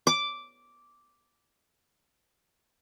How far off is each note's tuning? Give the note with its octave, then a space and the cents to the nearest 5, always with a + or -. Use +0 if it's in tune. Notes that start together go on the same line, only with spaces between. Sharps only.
D6 -5